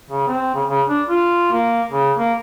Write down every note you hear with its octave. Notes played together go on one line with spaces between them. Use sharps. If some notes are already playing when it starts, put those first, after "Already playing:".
C#3
C4
C#3
C#3
D4
F4
A#3
C#3
A#3